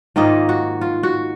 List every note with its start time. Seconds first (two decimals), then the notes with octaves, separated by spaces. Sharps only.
0.16 G#2 D#3 A#3 F4 D#5
0.49 F#4
0.81 F4
1.03 F#4